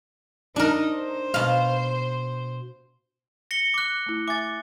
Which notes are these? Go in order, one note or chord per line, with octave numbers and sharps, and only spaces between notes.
D4 D#4 A#4
C5
B2 F5
A#6 C#7 G7
D6 F#6
A3 E4
E5 G#5 D6 A6